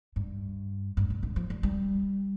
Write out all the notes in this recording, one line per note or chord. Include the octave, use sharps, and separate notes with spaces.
G2
G2
A#2
D3
F3
G3
G3